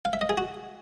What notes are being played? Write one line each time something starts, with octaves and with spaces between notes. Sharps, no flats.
F5
E5
D#5
G#4
F#4